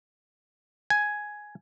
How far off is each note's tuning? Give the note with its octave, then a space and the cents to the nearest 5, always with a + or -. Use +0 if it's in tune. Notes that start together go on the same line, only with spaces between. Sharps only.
G#5 +5